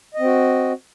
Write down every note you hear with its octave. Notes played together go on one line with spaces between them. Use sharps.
C4 F#4 D#5